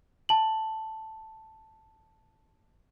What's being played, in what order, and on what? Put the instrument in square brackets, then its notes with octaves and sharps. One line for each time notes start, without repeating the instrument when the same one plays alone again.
[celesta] A5 F#7